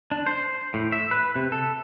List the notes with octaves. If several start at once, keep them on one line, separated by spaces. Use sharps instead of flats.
D4
C5
A2
E5
B4
C3
A4